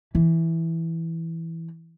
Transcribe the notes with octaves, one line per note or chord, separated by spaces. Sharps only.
E3